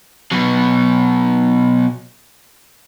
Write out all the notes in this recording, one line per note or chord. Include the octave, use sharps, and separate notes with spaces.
B2 F#3